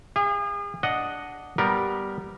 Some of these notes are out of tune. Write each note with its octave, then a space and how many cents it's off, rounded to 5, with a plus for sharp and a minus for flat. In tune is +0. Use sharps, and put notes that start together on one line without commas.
G#4 -40 F5 -30
D4 -5 D#5 +0 F#5 +0
G3 -5 B3 +0 A#4 +5